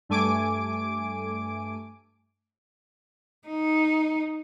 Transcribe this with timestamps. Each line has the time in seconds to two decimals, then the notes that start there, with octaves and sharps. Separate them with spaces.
0.09 G2 A3 G#5 D6 D7
3.48 D#4